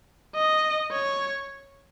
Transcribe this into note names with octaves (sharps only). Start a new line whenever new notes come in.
D#5
C#5